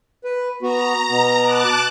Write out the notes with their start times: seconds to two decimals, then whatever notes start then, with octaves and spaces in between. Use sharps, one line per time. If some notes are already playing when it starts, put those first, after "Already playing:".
0.24 B4
0.62 B3 F#4 A#5
1.10 B2 B3
1.41 A5 D6 F#6